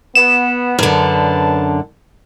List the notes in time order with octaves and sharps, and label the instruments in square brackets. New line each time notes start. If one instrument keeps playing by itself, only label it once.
[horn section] B3 [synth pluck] E7
[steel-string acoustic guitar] F#2 D3 [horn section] B4 D5 A5